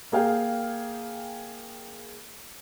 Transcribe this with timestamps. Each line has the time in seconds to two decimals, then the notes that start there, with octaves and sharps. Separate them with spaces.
0.12 A#3 G#4 F5 G5